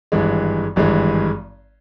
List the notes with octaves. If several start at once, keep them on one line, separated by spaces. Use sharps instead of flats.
G#1 G2 E3 G#3
G#1 G2 E3 G#3